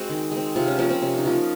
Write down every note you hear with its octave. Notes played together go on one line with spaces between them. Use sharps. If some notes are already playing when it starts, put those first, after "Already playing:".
Already playing: G#3 C4 F#4 C5
D#3
G#3 C4
C3 F4
C#4
F3 A#3 C#4
C4
C3 C#4
D#4
F3 A#3
F4